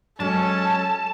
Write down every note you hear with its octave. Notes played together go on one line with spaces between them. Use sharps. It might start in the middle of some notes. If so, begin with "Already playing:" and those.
F#3 G#3 C#4 A4 A5